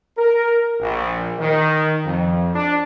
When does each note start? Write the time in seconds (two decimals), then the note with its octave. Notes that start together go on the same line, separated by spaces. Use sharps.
0.17 A#4
0.80 A#1
1.39 D#3
2.05 F2
2.54 D4